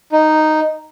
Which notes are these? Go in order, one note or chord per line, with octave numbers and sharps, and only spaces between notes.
D#4